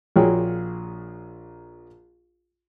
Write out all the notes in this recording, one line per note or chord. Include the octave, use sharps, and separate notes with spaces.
A#1 A#2 F#4 G#4 C#5 G5